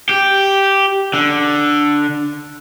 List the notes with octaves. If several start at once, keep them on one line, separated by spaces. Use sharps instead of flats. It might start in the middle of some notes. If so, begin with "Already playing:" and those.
G4
D3